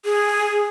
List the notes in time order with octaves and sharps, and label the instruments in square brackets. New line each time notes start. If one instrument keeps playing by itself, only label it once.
[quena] G#4